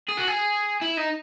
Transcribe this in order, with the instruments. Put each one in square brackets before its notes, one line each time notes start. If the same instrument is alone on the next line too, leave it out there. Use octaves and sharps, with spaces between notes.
[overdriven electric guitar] G#4
F#4
G#4
E4
D#4